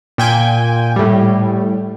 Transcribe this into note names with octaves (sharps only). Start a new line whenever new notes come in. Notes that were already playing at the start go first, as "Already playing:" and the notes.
A#2 G5 G#5
A2 G3